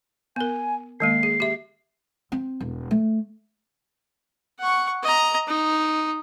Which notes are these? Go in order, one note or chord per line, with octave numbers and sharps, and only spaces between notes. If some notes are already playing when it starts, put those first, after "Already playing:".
B3 A#4 G#5
D#3 G#3 A#3 C7
G#4
G4 E5
C4
E1
A3
F#5 C#6
D#5 A#5
D#4